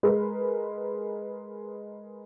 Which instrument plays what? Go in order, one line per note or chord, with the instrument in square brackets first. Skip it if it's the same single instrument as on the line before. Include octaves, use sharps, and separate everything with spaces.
[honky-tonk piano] G#3 A#4 B4